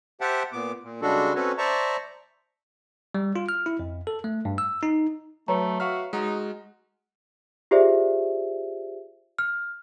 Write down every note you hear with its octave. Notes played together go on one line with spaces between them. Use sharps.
G4 C5 E5 F#5 G5 A5
A#2 B3 D6
A#2
C#3 G3 G#3 D4 F#4 A4
C4 C#4 F#4 A4 B4 C#5
C5 D5 E5 A5 A#5 C#6
G3
F4
F6
E4
F2
A4
A3
G2
E6
D#4
F#3 A3 B4 C#5 A#5
F#4 E5 F5 F6
G#3 D#4 F#4
F4 G4 G#4 C5 D5 E5
F6